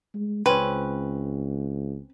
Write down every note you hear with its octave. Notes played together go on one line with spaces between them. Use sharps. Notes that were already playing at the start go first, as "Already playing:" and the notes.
G#3
C#2 C4 C#4 B4